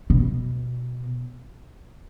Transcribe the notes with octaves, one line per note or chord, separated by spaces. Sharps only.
B2